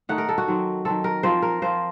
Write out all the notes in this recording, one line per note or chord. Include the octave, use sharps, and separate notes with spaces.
D#3 A3 D#4 F#5
A#4
A4
F#4
D#3 F#3 C4
D#3 F#3 C4 A4
A#4
F3 C4 F4 C5
A#4
F3 C4 F4 C5